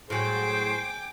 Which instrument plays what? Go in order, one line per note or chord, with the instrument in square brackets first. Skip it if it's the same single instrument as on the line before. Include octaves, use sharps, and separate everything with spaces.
[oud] A2 F#3 [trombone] G#4 [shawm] C5 [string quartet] G5 G#5 D6